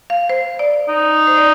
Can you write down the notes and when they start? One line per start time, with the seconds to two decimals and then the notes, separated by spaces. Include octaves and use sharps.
0.10 F5
0.29 C5
0.59 D5
0.89 D#4
1.27 C5
1.37 D5